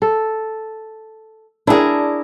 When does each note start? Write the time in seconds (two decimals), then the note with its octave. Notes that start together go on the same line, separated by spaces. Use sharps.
0.02 A4
1.67 D4 E4 G#4 A#4